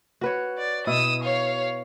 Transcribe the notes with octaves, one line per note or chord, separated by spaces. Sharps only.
F#4 B4 C#5
D5
B2 E4 D#6 E6
C#5 F5